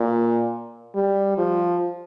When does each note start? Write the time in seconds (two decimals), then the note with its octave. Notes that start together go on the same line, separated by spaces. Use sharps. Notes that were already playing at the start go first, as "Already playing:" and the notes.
Already playing: A#2
0.95 G3
1.38 F3